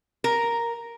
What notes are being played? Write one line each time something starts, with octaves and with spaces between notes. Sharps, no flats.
A#4